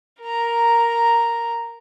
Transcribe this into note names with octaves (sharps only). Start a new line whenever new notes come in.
A#4 A#5